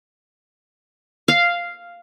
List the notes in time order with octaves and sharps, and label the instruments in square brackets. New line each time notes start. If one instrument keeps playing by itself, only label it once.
[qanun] F5